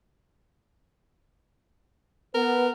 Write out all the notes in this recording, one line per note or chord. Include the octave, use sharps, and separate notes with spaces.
B3 A#4 B4